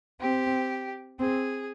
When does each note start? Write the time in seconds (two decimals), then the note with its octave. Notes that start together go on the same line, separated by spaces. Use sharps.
0.21 C4 G4
1.19 C4 G#4